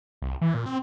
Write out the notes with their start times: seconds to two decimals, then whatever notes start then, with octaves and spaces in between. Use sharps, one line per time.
0.22 C2
0.41 E3
0.54 A#2
0.66 C4